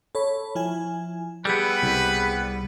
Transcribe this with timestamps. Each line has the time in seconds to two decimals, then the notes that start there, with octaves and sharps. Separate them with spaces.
0.15 A4 C#5 B5
0.55 F3 E4 G#5
1.45 G3 B3 G4 G#4 B4 E6
1.83 C2